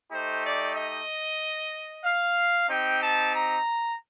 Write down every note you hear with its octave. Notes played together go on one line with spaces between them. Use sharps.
A3 D#4 G4 C5
D5
D#5
F5
C4 D#4 G4 G5
A5
A#5